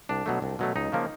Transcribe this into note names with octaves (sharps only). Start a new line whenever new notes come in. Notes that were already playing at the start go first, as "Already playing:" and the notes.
C2 D4
B2 F#3 A3
C2
B2 F#3 A3
C#2 D#4
C#3 F3 A#3